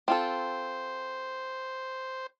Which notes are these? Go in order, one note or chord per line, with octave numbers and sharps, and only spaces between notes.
C4 F4 A4 C5